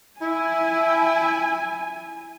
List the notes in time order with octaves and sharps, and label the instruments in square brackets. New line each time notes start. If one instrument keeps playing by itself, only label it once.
[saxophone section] E4 [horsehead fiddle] G#5